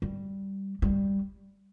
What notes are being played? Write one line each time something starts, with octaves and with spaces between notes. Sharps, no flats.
G3
G3